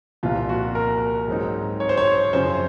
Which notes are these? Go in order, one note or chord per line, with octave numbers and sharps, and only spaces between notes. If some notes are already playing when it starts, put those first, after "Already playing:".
C2 A#2 F3 A#3 F4
F#4
A#4
G#2 F#3 C4 D#4
C#5
C5
C#5
F#2 C#3 F3 C4 C5